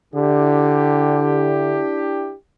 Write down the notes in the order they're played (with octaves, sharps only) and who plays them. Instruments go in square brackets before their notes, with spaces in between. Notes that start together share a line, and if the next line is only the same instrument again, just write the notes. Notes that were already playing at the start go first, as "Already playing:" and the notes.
[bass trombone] D3 [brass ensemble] D4 E4 G4